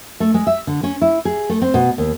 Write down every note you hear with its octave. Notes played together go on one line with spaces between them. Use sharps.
A3
G#3
E5
D3
C#4
E4
G#4
A3
C4
B2
D#2